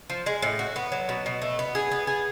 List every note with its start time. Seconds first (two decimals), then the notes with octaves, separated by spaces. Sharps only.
0.10 F3
0.26 G#3
0.42 A2
0.59 F#4
0.76 B3
0.92 F#3
1.09 B2
1.26 B2
1.42 A3
1.59 B3
1.75 G#4
1.92 B3
2.07 G#4